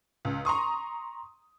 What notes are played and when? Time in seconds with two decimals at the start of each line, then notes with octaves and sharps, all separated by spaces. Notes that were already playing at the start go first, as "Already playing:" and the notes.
0.25 C#2
0.45 A#5 C6 C#6 D#6